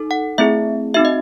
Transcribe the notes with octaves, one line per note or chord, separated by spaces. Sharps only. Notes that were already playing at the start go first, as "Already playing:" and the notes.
Already playing: D#4 A4
F#5
A3 C4 E4 G#4 E5
C4 D#4 F#4 E5
D#5